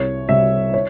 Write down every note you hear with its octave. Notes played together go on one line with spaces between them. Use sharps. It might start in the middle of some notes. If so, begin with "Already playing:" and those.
Already playing: C2 C#5
C3 G3 E5
C#5